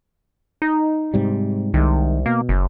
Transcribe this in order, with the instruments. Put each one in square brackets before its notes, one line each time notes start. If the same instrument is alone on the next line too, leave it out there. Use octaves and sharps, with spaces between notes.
[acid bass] D#4
[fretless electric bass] G#2 C3 G3
[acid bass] C2 [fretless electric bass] D#3 G#3
[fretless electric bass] B2 [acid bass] A#3
[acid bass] F#1